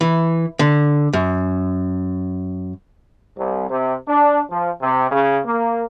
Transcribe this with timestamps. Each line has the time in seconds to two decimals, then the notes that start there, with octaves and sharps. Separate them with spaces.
0.01 E3
0.59 D3
1.13 F#2
3.38 C2
3.70 C3
4.08 D4
4.51 F3
4.82 C3
5.11 C#3
5.46 A#3